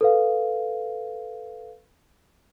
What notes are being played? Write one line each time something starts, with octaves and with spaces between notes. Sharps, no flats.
A4 B4 F5